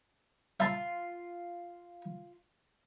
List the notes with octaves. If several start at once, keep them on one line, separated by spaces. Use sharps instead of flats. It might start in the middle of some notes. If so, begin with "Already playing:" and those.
F4 E5 A5